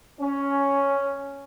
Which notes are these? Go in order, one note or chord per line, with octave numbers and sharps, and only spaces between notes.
C#4